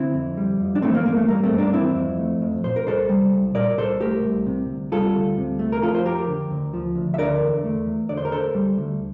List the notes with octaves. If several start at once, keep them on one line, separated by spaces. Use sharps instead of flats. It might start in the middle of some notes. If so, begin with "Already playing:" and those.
Already playing: D3 C4 E4
F2
G3
F2
D4
E3 A3 C4
A#3
G2 A#3
A3
G3 A#3
A3 C4
G2
A#3 D4
E3 C4 E4
F2
A3
F2
A#2 C5
A#4
C2 A4 C5
G3
C2
A#2 A#4 D5
C2 A4 C5
A3 G4 A#4
C2
C3
D2
G3 F4 A4
D2
C3
A3
A#4
F3 F4 A4
C5
F2 G4 A#4
D3
D2
F3
D2
E5
D3 A#4 D5
E2
A3
E2
D3 D5
C5
A#4
D2 A4 C5
G3
D2